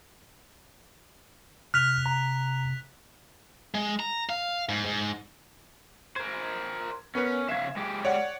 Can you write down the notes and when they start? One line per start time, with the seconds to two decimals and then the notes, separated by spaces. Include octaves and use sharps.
1.74 C3 F6 F#6 B6 F7
2.06 A#5
3.75 G#3
4.00 A#5
4.29 F5
4.69 G#2
4.86 G#2
6.16 A#4 C5 G#6
7.15 B3 C#4 A#4 B4
7.48 C#3 E5 F5 G#6 E7
7.77 G#3 G4
8.05 C#5 D5 F#5